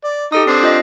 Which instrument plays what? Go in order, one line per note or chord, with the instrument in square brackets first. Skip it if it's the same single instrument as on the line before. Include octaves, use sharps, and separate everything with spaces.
[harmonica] D5
[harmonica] D#4 [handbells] G4 A4 D#6
[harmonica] C4 D4 [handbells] C7
[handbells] F4 D#5